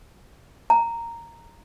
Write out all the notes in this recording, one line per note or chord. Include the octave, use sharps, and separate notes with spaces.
A#5